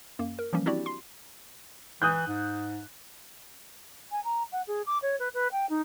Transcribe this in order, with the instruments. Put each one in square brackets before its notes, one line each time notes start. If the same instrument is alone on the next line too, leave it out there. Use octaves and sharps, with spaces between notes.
[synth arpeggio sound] F#2 A#3
A#4
E3 F3 G3 A#3 C#4
C4 D4 E4 F#4 G4 D5
C6 C7
[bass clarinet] E3 [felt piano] D#6 F#6 G6
[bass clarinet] G#2
[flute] G#5
A#5
F#5
G#4
D6
C#5
B4
B4
G5
D#4